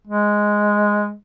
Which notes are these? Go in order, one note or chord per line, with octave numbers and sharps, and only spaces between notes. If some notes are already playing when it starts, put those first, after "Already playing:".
G#3